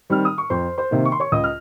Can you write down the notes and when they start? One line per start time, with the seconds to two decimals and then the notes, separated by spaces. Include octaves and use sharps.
0.10 D#3 G3 C4 F6
0.25 D#6
0.38 C#6
0.50 F2 C5 C6
0.78 C5 C6
0.91 C3 D#3 A#3
1.05 C#6
1.12 C6
1.20 C#5 C#6
1.32 C#2 D#5 D#6
1.44 F6